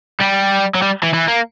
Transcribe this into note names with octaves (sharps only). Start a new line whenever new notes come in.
G3
F#3
G3
E3
E3
A#3